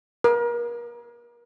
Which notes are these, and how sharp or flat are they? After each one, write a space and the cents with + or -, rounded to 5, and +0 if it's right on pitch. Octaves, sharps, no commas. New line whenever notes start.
A#4 +35